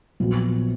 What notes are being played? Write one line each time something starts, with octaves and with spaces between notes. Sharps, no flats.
A#1 A#2 F#3 B3